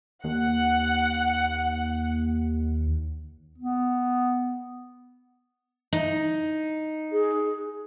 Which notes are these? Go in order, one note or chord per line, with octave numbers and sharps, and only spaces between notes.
D#2 F#5
B3
D#4
G#4